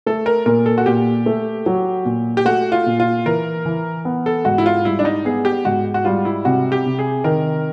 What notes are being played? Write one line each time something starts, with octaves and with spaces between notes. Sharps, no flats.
A3 A4
A#4
A#2 A#4
A4
F#4
A#2 G4
A3
F#3
A#2
G4
A3 F#4
F4
A#2
F4
E3 A#4
E3
B3
A4
G#2 F#4
E4
F4
G3 E4
D4
D#4
B3 G#4
G4
G#2 F#4
F#4
G3 F4
E4
C3 F#4
G4
C3
G#4
D#3 A#4